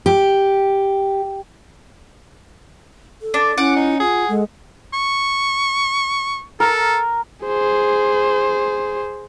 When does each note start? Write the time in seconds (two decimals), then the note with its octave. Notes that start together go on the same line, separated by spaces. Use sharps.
0.06 G4
3.22 A4
3.34 D4
3.58 C#4 E4 F#5 D6
3.76 D#4
4.00 F4 G#4
4.29 G#3 A4
4.93 C#6
6.60 A4 A#4
7.46 G#4 C5